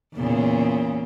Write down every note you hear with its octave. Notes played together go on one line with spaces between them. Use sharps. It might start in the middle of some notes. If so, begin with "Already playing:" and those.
E2 A#2 C#3